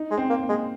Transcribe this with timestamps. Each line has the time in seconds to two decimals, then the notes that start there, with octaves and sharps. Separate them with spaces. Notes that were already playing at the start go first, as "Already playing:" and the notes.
Already playing: D#4
0.11 G#3
0.18 C4
0.30 A#3
0.43 A#3
0.49 G#3